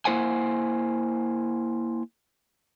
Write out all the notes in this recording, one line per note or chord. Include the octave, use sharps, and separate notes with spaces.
A#3 E4 C5 F#5 G#5